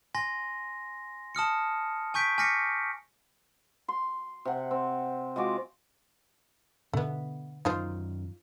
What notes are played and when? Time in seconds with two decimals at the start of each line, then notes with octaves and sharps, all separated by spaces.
0.15 G#5 C6 A#6
1.35 A5 D#6 F6 C#7
2.14 G#5 C#6 G6 B6 D7
2.38 G#5 D6 F6 A#6 B6 C#7
3.88 C6
4.45 C3 F#5
4.71 C4
5.36 G#3 F4 F#4 D6
6.93 B2 D3 A3 B3
7.65 F#2 D#3 D#4 F4 C5